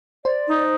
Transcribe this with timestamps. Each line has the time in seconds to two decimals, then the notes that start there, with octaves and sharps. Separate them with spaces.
0.25 C5 D5
0.48 D#4